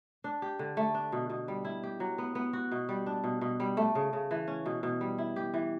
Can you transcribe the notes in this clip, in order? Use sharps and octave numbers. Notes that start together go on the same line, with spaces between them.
D4
G4
D3
A3
D4
B2
B2
G3
E4
G4
F#3
B3
B3
F#4
B2
G3
D4
B2
B2
G3
A3
C#3
C#3
E3
C#4
B2
B2
G3
E4
G4
E3